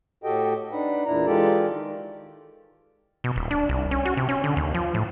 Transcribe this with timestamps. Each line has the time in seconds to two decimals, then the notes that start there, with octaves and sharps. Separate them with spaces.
0.24 A2 F#4 G4 A4 D#5 G5
0.72 D4 D#4 B4 F#5
1.05 E2 A#2 D4 E4 A#5
1.26 E3 G#3 F4 G4 A4 D5
1.69 D#3
3.24 B2
3.36 D#1
3.51 D4
3.69 C2
3.91 C#4
4.05 F#4
4.17 C3
4.29 C#4
4.44 D3
4.57 D#2
4.74 F3
4.94 A2